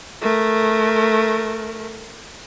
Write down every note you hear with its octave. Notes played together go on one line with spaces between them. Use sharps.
A3 A#4